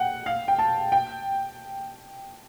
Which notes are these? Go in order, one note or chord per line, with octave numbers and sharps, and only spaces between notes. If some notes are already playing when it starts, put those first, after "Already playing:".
Already playing: F#5 G5
F5
G5
A5
G5